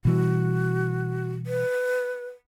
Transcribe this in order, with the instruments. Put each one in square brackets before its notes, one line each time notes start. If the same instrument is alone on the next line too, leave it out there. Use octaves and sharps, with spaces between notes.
[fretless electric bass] B2 E3 G3 [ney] F#4
[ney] B4